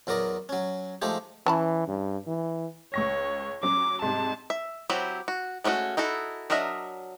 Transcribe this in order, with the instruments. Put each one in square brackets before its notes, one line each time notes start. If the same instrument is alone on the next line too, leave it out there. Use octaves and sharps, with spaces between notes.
[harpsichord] E2 F#3 A#4 D5 D#5
F#3 C#4
F3 G#3 A3 D#4 G4
[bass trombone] E3 [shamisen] C#4 A5 B5
[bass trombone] G2
E3
[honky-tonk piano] C#2 C#6 A#6 [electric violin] C#5
[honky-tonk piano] F#3 C#4 [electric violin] D6
[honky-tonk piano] G#2 C3 G3 [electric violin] A5
[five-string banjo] E5
F#3 C4 E4 G4
F#4
G#3 A3 C#4 D4 F#4
D#4 E4 F#4 A4
F#3 D4 A#4 D#5 E5